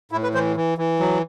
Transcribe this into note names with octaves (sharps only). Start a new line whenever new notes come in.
A2 E4
B4
E3 C5
E3
E3
F#3